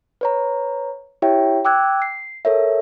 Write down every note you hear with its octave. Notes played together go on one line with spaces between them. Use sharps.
B4 C#5 A#5
E4 G4 C#5 E5 G5
G5 D6 E6 F#6 G#6
C7
A4 A#4 C#5 E5